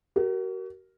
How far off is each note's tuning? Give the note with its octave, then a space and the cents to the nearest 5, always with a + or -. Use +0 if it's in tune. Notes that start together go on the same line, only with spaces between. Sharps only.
F#4 +40 A#4 +0